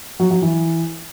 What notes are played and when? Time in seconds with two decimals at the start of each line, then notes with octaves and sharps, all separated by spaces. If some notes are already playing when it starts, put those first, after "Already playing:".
0.20 F#3
0.31 F#3
0.42 E3